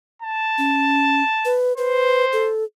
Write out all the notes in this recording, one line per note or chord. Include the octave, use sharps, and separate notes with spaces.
A5
C#4
B4
B4 C5
A4